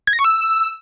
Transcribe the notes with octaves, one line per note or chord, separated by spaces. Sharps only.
G#6
A#6
C#6
E6